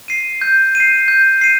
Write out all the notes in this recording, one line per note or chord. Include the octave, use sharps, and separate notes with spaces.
C7 D#7
G6
D#7
C7
G6
C7 D#7